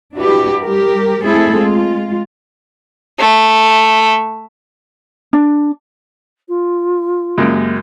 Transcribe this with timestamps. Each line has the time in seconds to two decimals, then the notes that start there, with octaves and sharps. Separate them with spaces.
0.17 D4 E4 F#4 G4 B4
0.62 G3 G4 A#4
1.23 G#3 A3 C4 E4 G#4 A4
1.55 G#3 F4
3.19 A3
5.33 D4
6.48 F4
7.38 F#2 C#3 G#3 A#3 F#4 G4